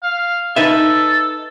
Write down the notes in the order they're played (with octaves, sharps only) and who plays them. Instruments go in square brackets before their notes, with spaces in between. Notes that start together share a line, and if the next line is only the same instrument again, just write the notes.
[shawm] F5
[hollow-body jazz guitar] D#4 B4 E5 [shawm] A4